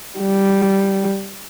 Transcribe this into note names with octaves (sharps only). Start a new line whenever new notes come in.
G3